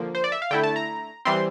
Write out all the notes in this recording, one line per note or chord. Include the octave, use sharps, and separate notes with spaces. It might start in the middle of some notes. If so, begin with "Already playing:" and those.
Already playing: D3 F3 A#3
C5
D5
E5
F5
D3 A3 E4 G5
A5
A#5
E3 G3 C4 C6